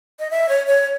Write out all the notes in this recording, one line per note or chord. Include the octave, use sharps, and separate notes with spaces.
D#5
E5
C#5
C#5